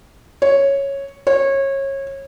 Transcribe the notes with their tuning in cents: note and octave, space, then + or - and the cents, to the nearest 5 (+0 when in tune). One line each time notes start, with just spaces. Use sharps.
C#5 -5
C#5 -25